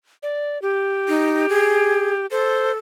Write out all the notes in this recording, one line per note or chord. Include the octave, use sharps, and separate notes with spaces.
D5
G4
D#4
G#4
A4 C5